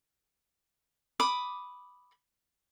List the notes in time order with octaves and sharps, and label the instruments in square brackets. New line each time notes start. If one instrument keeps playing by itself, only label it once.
[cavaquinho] B5 D6 D#6